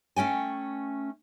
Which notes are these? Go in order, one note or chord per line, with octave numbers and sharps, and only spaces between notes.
A3 C#4 G5 G#5